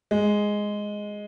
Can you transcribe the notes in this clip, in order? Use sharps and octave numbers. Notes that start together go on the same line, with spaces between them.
G#3